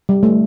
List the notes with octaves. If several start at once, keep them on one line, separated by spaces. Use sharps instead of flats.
G3
A3